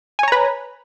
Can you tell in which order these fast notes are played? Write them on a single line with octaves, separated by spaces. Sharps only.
G#5 C#5 A#5 B4